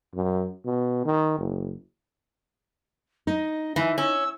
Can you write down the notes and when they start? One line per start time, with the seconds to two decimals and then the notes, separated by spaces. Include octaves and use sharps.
0.15 F#2
0.65 B2
1.05 D#3
1.38 F#1
3.27 D#4 D#5
3.76 E3 D#4 G#5
3.98 C#4 E6